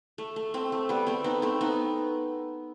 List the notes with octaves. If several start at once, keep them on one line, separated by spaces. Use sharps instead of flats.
A3
A3
A3 C4
A3
G3 B3
A3 C4
B3 D#4
A3 C4
B3 D#4